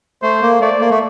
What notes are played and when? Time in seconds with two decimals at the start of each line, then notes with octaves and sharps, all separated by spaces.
0.22 A3 C5
0.42 A#3
0.61 A3 D5
0.81 A#3
0.90 A3